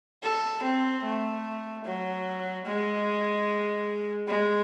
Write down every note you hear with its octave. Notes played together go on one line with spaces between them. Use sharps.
A4
C4
A3
F#3
G#3
G#3